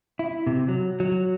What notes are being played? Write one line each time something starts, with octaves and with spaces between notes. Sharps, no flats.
E4
C3
F#3
F#3